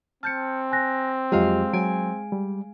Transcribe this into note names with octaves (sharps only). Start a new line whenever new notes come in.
C4 A5 F6 G6 C#7
G#5 F#6 A#6
F2 F#3 G#3 F4 G4 D#5 F5
F#3 G#5 D7
G3